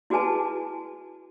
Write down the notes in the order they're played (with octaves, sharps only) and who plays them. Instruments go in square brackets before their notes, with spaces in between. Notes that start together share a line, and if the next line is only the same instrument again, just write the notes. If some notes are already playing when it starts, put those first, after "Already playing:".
[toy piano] E4 F#4 G#4 B4 G#5 A5